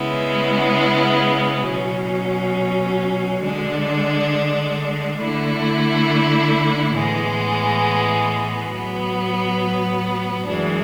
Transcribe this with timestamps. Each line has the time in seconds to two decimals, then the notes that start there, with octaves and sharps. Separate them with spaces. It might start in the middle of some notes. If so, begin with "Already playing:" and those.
Already playing: C#3 G#3 B3 E4
1.66 B2 F#3 C#4
3.43 D3 G#3 D4
5.19 D3 A3 E4
6.95 A2 E3 G#3 B3
8.71 A2 F#3 B3
10.47 F#2 E3 G#3 D4